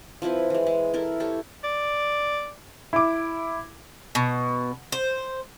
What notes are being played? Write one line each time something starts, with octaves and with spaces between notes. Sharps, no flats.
F3 C4 E4 B4
E3 G#3
G#3
E4 A4 A#4
G4 A4 C#5
D5
E4 D6
B2
C5